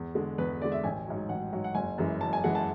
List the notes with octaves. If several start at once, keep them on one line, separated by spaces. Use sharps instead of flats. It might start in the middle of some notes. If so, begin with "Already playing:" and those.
Already playing: E2
D3 G#3
E2 B4
D3 G#3 D5
E5
A1 G#5
G#2 F#3
A1 F#5
G#2 F#3
F#5
F#1 G#5
F#2 E3 G#3
F#1 A5
G#5
F#2 E3 G#3 F#5
A5